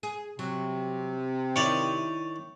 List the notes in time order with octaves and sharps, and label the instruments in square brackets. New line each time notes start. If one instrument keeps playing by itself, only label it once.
[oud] G#4
[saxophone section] C3 [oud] F#3
[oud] D#3 E4 [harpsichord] C#5 D5